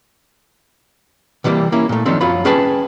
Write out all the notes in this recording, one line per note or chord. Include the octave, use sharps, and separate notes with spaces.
C3 E3 G3 G#3 A#3
A#3 C#4 E4
A#2 A3
D#3 F3 F#3 A3 C4 D4
F#2 F3 F#3 F4 B5
C#4 G#4 B4 G5 A5